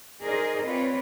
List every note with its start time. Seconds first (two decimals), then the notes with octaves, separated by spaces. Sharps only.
0.23 D#4 G#4 A#4 C5 D5 D#5
0.65 C4 F4 B4 C#5 D5